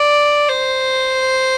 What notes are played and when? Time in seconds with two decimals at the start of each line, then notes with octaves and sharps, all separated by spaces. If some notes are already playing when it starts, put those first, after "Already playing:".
Already playing: D5
0.49 C5